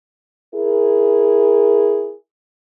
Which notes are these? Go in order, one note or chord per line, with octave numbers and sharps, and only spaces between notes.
E4 G#4 A#4